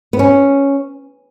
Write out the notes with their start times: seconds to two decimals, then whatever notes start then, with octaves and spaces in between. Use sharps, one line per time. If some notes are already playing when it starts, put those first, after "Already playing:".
0.13 B3
0.19 C#4